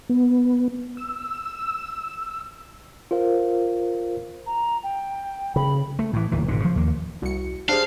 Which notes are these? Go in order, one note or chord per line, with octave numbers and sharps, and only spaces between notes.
B3
E6
F4 A#4 C5 F5
A#5
G5
C#3 B5
A3
A2 E3
D1 A#2 E3
G#1 G#2 B2 D3
C#3 F3
D#2 A#3
C2 F#4 C#7
D4 G4 G#4 C5 F5